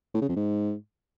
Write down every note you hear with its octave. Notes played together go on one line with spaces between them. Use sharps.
A2
C#3
F2
G#2